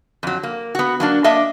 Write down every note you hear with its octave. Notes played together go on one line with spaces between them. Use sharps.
F2 F#3
A#3
B3 F#4
F#3 A#3 D4
A#3 D4 D#5 E5